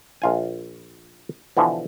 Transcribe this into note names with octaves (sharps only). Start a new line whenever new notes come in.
A#1 F4 G#5
B2 D3 E3 F3